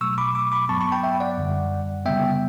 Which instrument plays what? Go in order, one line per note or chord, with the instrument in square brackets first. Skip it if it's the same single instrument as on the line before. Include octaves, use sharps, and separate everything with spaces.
[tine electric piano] B2 F#3 A3 C#6 E6
B5 D6
B5 D6
B5 D6
G2 F#3 B3 A5 C#6
A5 C#6
G5 B5
E5 G5
D5 F#5
F#2 D3 G3
C#3 G3 B3 E5 G5